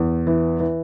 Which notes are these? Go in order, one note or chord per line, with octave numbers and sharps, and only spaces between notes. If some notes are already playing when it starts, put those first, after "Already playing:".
Already playing: E2
E3
E3